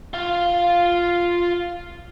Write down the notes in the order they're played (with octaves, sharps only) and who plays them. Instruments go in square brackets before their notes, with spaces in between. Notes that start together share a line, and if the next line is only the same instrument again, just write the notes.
[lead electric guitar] F4 F5